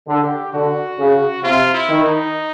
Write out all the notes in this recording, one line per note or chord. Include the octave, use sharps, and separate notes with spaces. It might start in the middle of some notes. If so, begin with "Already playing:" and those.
D3
G4
D3 F#4
C#3
C3 F4
E4
D#3
D#4